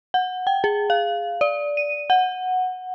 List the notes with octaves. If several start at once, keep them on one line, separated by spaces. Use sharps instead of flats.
F#5
G5
G#4
F5
D5
D#7
F#5